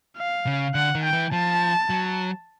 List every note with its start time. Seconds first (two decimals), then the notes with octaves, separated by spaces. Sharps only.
0.18 F5
0.47 C#3
0.75 D3 F#5
0.95 D#3
1.04 G5
1.13 E3
1.32 F3 A5
1.90 F#3